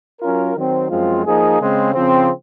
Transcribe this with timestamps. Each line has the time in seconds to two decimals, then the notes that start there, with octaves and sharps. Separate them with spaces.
0.20 F#3 C#4 F4 A#4
0.55 D#3 F#3 C4
0.90 F#2 F3 G#3 C4 F4
1.25 F3 A#3 D#4 G#4
1.59 C#3 G#3 C4
1.95 C#3 F3 C4